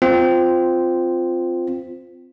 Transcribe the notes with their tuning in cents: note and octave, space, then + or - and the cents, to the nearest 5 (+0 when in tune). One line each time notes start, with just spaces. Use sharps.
C4 -10 F4 +0